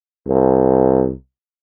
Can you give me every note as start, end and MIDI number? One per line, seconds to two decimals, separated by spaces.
0.27 1.11 36